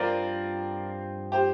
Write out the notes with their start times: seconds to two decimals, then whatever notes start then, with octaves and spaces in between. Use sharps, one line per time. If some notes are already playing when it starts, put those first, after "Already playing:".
Already playing: G2 F3 C4 F4 A#4 D5
1.32 G4 C5